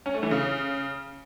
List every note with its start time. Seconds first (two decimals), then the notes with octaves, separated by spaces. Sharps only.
0.06 C#4
0.14 A3
0.23 E3
0.31 C#3